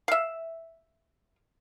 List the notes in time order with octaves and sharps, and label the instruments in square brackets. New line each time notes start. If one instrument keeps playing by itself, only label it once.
[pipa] E5 F5